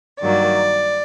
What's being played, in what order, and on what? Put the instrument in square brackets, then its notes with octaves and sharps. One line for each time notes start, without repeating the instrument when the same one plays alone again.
[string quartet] G2 D#3 F#3 A#3 D5